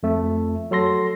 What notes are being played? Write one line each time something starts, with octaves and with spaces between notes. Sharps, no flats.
F2 A3
F#3 A4 C6 A#6